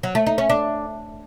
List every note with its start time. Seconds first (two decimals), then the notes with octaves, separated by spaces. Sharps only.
0.03 F#3
0.15 A3
0.26 D#4
0.38 C#4
0.50 D4